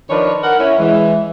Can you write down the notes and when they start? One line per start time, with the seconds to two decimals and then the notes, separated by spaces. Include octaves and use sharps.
0.10 D#3 F3 D4 A#4 B4 C#5
0.44 A#4 F#5
0.60 C#4 E4
0.79 E3 G#3